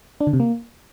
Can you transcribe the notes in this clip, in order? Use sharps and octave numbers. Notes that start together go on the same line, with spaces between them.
D4
D3
C3
A#3